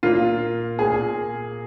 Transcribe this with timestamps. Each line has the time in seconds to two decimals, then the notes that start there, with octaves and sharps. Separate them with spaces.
0.03 A#2 A#3 F4
0.79 A#2 A#3 G#4